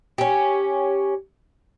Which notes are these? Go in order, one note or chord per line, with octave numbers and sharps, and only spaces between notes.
C#4 G4